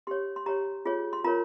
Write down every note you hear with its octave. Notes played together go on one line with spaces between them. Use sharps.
G4 C#5 C6
C6
G4 C#5 A#5
F4 G#4 C#5
C6
F4 A#4 C#5 A#5